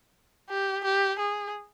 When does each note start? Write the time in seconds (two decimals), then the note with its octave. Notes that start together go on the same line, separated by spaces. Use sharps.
0.50 G4
0.84 G4
1.19 G#4